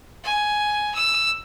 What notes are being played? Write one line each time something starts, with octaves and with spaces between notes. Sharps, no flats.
G#5
E6